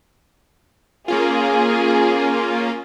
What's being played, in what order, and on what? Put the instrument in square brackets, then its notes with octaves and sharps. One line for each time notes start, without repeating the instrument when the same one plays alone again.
[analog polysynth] A#3 C#4 F4 [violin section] G#4